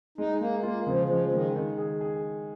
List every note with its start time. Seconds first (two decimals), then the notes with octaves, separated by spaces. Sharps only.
0.18 G#3 D#4
0.40 G#3 A#3
0.63 A#3 F4
0.87 C#3 F3
1.09 F3 G#3
1.32 D#3 G#3
1.56 D#3
1.78 G#4
2.01 G#4